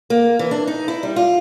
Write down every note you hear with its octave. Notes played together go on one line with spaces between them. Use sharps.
A#3
E3
D4
D#4
E4
G3
F4